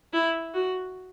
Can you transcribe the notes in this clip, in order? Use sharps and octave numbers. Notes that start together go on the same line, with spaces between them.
E4
F#4